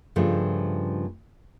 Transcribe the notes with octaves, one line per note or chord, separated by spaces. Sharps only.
G2 C#3 F3 A3